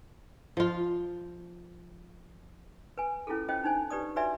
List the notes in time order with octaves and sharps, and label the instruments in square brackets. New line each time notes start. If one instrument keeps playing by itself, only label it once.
[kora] F3 F4
[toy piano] B4 G#5
C#4 E4 F4 G#4 A4
C#4 F4 C5 D#5 G5
D4 D#4 C5 G#5
G4 B4 D5 D#6
F#4 B4 C#5 D5 E5 G#5